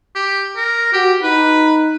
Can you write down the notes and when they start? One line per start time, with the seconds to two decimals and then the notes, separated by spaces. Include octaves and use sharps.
0.15 G4
0.57 A#4
0.93 F#4 G4
1.23 D#4 B4